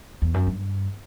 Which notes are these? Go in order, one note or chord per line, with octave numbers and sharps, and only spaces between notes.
E2
F#2
G2